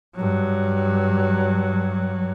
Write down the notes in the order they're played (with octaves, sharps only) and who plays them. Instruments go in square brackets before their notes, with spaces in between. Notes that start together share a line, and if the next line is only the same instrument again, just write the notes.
[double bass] G2 F#3